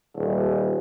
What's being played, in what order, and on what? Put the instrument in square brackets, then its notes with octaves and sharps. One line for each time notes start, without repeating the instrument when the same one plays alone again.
[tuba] D#1